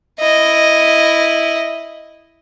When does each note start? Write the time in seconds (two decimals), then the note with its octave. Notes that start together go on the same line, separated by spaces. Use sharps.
0.20 E4 D#5